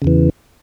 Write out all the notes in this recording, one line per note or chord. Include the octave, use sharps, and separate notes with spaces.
E2 C#3 E3